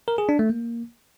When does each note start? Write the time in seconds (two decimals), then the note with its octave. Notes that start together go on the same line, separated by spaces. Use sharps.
0.08 A#4
0.18 G#4
0.29 D4
0.39 A3
0.50 A#3